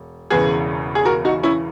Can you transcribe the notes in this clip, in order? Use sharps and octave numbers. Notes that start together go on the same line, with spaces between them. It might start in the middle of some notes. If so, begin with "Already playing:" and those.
Already playing: E1
E1 E2 C#3 E3 G#4 B4
G#4
F#4 A#4
D#4 F#4
C#4 E4